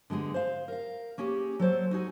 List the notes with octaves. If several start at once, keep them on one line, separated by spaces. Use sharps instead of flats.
D3 G#3 B3 G#4
C5 F5
A#4 F5
A#3 C#4 G4 G#4
F#3 A4 C5 C#5
D#4 F#4 G#4